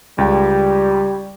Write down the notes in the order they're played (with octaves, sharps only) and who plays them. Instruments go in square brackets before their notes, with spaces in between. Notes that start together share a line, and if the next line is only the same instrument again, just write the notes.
[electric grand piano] C#2 G5 [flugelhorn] G3